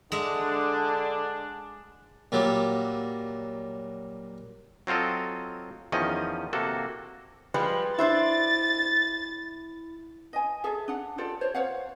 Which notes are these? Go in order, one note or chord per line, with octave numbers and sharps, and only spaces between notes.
D3 G#3 D4 E5
A#2 F#3 G3
F#3 C4 F4 A4 D#5
E2 D#3 F3 C#4 D#5
C3 A#3 F#4 A4
F3 G3 G#3 B4 C6
D4 E4 C5 E5 A6
D#5 G#5
G#4 A4 E5
D4 F#5
F4 G4 A4 D5
C5 C#5
C5 C#5 F5 F#5